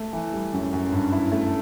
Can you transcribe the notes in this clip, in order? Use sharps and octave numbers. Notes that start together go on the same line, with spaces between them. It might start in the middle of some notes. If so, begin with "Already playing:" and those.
Already playing: A3
E3
G3
F#2
F#2
G2
E4
A3